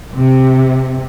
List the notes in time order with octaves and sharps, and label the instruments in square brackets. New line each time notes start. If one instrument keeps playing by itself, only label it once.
[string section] C3